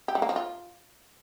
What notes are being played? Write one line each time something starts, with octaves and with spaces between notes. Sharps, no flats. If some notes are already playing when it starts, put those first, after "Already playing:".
G4
G3
A#3
F3
F4